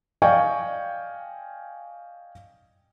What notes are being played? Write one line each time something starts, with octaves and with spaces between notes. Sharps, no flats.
D5 D#5 F5 G5 G#5 C#6